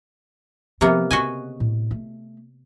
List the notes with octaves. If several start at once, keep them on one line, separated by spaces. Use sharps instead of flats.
C3 F3 A#3 B3
C#3 F#4 D#5 G#5
A2
A3